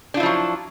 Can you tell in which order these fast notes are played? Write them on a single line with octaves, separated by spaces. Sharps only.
D4 F4 E4 F3 F#3